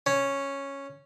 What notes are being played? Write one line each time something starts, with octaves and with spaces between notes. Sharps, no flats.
C#4